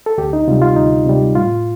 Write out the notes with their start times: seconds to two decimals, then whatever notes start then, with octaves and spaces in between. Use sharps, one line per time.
0.06 A4
0.18 D2 G4
0.33 D#4
0.48 C3 F4
0.51 G3
0.62 F4
0.76 D2 D#4
1.06 C3 G3
1.35 A2 F4